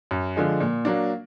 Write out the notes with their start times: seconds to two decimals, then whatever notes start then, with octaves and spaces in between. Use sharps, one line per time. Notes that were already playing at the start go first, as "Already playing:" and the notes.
0.11 F#2
0.36 D3 F3 G#3
0.60 A#2
0.85 F#3 A#3 D4